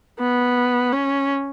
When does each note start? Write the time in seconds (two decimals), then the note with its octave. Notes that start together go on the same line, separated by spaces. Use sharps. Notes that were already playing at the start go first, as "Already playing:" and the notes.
0.19 B3
0.92 C#4